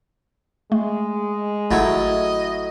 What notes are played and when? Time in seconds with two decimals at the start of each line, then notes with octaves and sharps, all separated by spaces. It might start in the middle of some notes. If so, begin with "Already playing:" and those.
0.72 G#3 A3
1.71 G#1 A2 F#3 E4 D#5 G#6 A6